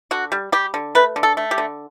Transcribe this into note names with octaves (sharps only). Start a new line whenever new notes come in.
D3 F#4
G3
G3 G4
D3
A3 B4
D3
A4
A3
G4
D3